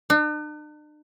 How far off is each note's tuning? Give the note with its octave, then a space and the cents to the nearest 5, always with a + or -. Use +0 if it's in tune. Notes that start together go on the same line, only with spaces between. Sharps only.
D4 +45